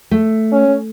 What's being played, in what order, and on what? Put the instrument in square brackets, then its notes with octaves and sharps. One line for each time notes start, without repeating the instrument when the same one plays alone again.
[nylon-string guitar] A3
[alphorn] C#4